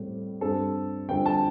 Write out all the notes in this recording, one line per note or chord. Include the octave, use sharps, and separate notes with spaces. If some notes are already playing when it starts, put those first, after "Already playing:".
Already playing: A2 G3 C4
G2 G3 C4 A4
F2 D3 G3 C4 G5
A5